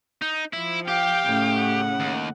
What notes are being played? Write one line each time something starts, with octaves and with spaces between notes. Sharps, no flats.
D#4
F3 E4
G4 F5 G5
A2 C#3
F#5
D#2